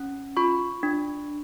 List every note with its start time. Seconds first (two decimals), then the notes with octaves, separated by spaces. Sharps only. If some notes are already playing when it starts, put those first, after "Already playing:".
Already playing: C#4
0.37 F4 B5 C#6
0.83 D4